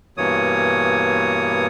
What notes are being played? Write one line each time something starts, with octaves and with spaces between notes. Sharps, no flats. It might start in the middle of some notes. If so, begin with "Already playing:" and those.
G2 B2 E3 A#3 C#5 D#6